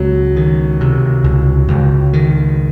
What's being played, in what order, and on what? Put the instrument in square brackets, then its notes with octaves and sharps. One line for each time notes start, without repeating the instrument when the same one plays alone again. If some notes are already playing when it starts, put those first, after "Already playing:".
Already playing: [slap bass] C#2 [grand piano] F#3
[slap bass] D#3
C3
C#2
C#2
D#3